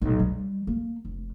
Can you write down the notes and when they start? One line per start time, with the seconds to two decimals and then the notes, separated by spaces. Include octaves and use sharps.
0.02 B1 A#2
0.19 G3
0.67 A#3
1.05 F1